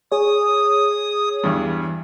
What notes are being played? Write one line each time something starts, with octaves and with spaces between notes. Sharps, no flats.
G#4 C#5 D#6
E2 G2